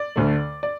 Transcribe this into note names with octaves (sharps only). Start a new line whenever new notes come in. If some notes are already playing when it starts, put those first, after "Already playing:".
Already playing: D5
D2 D3 A3
D5